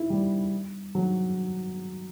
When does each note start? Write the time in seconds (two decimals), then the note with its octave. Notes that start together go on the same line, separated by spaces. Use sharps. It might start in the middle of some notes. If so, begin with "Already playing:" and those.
Already playing: E4
0.10 G3
0.95 F#3